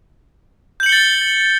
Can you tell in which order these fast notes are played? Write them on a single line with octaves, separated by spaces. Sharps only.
G6 F#7 C#7 G7 A6